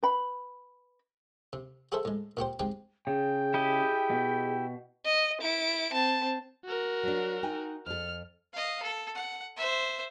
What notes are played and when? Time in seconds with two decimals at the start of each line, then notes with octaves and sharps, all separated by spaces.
0.03 B4 B5
1.53 C3
1.92 F#4 G#4 A4 C5 E5
2.05 A2 G#3
2.37 A#2 F#4 G4 C5
2.59 G#3 C4 D#4 G4 G5
3.07 C#3 G#4 G5
3.54 E4 G4 D#5
4.10 B2
5.05 D#5
5.42 E4 D7
5.93 C4 A5
6.65 F#4 A#4
7.03 F#3 D4
7.43 D#4 G5 G#5
7.86 F2 A4 F6
8.53 D#5 F5
8.83 A4
9.15 F#5
9.57 C5 E5